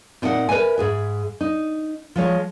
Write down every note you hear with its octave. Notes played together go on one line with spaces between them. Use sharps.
A#2 C4 D#4 E5 F#5
A#4 B4 D#5 E5 G#5
G#2 G#4 E5
D#4
F3 G#3 C#5